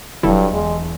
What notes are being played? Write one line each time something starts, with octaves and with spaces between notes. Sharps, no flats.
E1 G2 F#3 E4 A4
E2 G#3